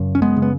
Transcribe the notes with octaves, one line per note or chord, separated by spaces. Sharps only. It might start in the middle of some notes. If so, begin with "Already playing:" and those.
Already playing: F#2 C#3
C#4
G#3 B3
C#3
B3